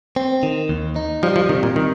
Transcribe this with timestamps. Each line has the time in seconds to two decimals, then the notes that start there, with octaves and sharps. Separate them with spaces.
0.16 C4
0.43 D#3
0.69 D#2
0.96 D#4
1.23 F3 G3
1.36 F3
1.49 C3 D#3
1.63 A#2
1.76 D#3